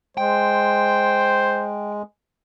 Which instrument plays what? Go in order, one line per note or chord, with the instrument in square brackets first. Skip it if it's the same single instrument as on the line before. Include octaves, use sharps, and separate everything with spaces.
[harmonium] G#3 [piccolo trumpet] C5 [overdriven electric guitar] G5